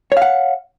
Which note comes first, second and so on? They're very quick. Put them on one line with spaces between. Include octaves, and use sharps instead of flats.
C#5 F5 F#5